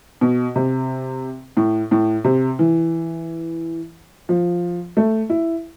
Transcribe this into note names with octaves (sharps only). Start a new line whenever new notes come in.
B2
C3
A2
A2
C3
E3
F3
A3
E4